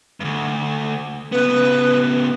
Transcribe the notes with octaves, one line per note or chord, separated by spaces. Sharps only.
D2 G2
C#3 B3 B4